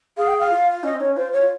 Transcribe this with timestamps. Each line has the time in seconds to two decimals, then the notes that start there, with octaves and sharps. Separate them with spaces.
0.17 G#4 F5
0.28 G5
0.39 F5
0.50 F4
0.83 C#4 D#5
0.94 C4
1.00 D#4 C#5
1.05 C#4
1.17 F4 C5
1.33 C#5
1.41 F4